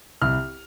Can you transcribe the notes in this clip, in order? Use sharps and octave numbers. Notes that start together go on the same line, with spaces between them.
C2 F6